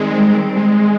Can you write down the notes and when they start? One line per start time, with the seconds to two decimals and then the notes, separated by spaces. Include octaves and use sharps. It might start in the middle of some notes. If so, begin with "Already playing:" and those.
Already playing: D#3 G3 G#3 C4
0.56 G#3